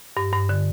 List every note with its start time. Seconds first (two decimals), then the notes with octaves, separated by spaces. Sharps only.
0.17 G2
0.33 G2
0.49 D3